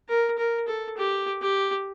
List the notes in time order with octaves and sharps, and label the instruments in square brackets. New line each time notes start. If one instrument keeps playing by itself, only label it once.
[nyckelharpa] A#4
A#4
A4
G4
G4